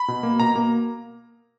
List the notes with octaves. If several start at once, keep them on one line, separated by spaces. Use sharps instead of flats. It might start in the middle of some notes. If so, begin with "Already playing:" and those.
Already playing: B5
B2
A#3
B2 A#5
A#3